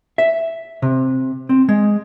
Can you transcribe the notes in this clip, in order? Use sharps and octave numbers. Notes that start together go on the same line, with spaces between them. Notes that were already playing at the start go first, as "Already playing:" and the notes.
E5
C3
C4
G#3